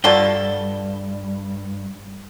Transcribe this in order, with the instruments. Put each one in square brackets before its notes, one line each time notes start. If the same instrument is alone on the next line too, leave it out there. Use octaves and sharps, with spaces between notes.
[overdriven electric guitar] G2 [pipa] F4 F#4 A4 [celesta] D5 G7